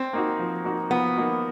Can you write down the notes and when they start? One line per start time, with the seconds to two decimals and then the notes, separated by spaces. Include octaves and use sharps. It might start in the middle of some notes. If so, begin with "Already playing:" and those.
Already playing: C4
0.13 A#3 D#4 F#4
0.39 F3
0.64 A#3 D#4 F#4
0.90 F3 B3
1.17 A#3 D#4 F#4